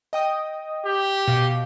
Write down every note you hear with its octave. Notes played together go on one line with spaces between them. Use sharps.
D#5 G5 D#6
G4
B2 F5